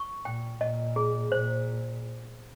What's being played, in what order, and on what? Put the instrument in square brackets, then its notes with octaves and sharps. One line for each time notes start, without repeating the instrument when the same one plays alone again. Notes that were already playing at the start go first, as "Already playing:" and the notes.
Already playing: [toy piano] C#6
[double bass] A#2 [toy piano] G5
[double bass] A#2 [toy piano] D#5
[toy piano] G#4
[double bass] A#2 [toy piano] C5